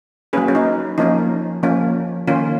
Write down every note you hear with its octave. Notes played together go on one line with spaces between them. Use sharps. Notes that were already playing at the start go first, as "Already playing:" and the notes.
F#3 A#3 C#4 G#4 B4
C#4
D#4
F3 A#3 C#4 D#4
F3 A#3 C#4
D#3 A#3 C#4 F4